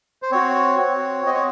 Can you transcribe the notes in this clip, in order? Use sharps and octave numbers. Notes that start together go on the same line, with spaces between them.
C5
C4 F#4 C#5
C4 F#4
C4 F#4 D#5
C#5